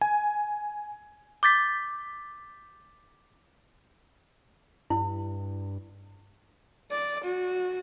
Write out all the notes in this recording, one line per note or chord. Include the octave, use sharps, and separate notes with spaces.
G#5
D6 G6 A6 B6
G2 E4
D5
F#4